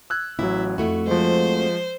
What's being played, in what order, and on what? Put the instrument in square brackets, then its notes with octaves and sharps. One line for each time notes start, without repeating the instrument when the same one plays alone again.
[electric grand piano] E6 F#6 G#6
[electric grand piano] A1 F#3 [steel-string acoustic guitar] E4
[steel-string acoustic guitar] F2 A3 F#4 [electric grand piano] E4
[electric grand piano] F3 G#3 [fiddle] C5